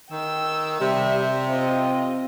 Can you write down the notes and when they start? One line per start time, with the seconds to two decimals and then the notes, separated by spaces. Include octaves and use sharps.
0.11 D#3 G5 E6
0.81 C3 G3 E5
1.49 C4 F4 D#5